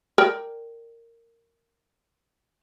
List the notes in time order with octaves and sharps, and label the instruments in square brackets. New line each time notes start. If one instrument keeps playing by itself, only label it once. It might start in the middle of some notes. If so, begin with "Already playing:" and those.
[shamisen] A#4 D5 G5